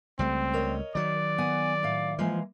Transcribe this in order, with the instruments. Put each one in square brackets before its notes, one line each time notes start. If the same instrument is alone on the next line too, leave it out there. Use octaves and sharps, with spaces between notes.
[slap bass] C#2 G3 A3 [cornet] C4
[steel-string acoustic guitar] A#4 C#5 D#5
[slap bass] D#3 F#3 [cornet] D5
[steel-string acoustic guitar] B3 F#5 G#5
A2 F5
[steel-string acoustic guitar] E3 G#3 A#3 [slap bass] F3